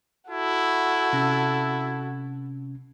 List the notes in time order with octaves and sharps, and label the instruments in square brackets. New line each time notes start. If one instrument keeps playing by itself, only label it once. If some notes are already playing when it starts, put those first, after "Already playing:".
[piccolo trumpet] E4 [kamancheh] F#4 A4
[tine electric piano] C3 C#4